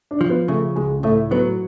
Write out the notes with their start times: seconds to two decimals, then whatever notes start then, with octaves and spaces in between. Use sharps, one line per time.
0.11 D4
0.21 F3
0.29 B3
0.48 C#3 A3
0.76 C#2 G#3
1.03 A2 A3
1.31 F#3 B3